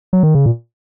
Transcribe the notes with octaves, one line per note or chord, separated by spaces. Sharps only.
F#3
D#3
C#3
A#2